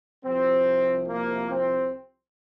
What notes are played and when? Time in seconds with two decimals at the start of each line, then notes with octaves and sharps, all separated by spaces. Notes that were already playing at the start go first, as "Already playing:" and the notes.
0.24 C2 C3 F3 C4
1.08 A#3
1.49 C4